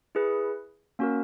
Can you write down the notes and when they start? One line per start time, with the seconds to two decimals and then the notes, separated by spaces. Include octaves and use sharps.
0.15 E4 G#4 B4
0.99 A#3 C#4 F#4 A#4